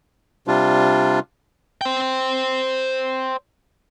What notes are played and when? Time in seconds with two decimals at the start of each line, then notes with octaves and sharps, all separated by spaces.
0.47 C3 G3 D4 F4
1.81 C5 G5